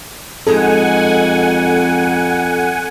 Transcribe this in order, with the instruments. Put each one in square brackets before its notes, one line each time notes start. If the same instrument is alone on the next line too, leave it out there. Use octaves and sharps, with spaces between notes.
[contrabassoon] F2 [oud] G#3 D#4 G#4 [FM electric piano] A4 [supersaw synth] F#5 G#5